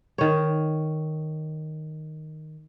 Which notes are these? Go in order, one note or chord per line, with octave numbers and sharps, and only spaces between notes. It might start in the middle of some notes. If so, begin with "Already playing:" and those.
D#3 C#5